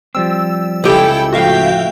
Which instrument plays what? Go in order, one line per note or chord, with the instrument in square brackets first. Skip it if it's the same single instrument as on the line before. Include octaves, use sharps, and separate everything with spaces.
[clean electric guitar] F3 G3 C4 [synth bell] E6
[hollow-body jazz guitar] C#2 G4 [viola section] E4 A4 G5
[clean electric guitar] A2 F3 [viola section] A3 G5 [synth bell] F#4 E5 F5